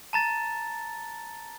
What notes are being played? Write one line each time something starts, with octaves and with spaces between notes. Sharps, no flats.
A5 A#5 A6